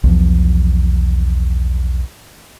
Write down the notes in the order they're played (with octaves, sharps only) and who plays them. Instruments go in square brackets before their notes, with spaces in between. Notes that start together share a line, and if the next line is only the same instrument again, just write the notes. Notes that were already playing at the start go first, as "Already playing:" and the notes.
[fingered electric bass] B1 E2 F3